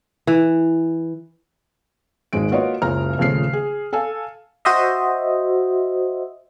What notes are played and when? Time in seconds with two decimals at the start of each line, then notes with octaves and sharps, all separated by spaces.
0.27 E3
2.33 D#1 G#1 D#3 G#3 D7
2.52 A#3 F4 F#4 B4 C#5 D#5
2.82 F#1 C#2 C#3 A#5 F6
3.18 D#1 C#3 F3 A3 F6 C7
3.53 G#4
3.93 A4 F5 G#5
4.65 F#4 C5 D#5 E5